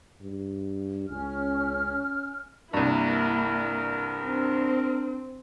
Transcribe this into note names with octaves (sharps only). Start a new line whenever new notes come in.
G2
C#2 C#4 F6
C2 G2 A#3 E4 A#4
C4 D4